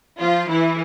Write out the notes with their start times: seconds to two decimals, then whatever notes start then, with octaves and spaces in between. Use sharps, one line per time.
0.21 F3 F4
0.49 E3 E4